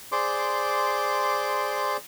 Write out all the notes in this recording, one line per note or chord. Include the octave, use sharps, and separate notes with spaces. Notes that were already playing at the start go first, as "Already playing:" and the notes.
G#4 C5 D5 C6 D6